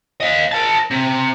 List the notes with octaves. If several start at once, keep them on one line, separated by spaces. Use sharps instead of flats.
D#5 F5
A#4 A5
C3